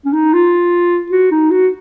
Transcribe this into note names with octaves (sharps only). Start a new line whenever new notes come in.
C#4
D#4
F4
F#4
D#4
F#4